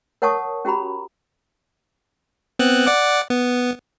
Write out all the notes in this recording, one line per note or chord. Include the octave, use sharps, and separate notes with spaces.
A#4 C#5 F#5 A5 C#6 D#6
C#4 F#4 G4 A#5 B5
B3 C4 F#6
D5 F#5 D6
B3